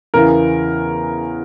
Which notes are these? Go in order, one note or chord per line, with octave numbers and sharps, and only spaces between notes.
E2 C#3 E3 A#4